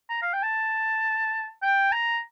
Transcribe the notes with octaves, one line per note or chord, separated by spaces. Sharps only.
A#5
F5
G5
A5
G5
A#5